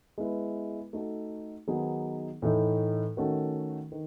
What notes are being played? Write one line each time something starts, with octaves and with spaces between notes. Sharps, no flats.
G#3 B3 E4 B4
A3 D#4 F#4 A4
D#3 F#3 B3 D#4 G#4
A2 E3 A3 D#4
D#3 A3 C#4 F#4 A4
D#3